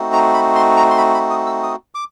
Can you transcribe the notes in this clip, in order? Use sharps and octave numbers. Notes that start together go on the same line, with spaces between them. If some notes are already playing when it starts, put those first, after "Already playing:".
Already playing: A3 C4 D#4 F#4
A#5
B5
C6
A#5
C6
B5
B5
D#6
E6
D#6
D6